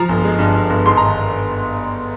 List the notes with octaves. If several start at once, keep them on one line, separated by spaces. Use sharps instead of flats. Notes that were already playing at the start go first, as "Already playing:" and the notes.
Already playing: F3 A#5
G1
G#3
G2
G2
G1
G#2 C6
D#3 A#5